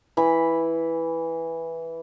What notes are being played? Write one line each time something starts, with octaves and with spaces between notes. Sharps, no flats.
E3 B5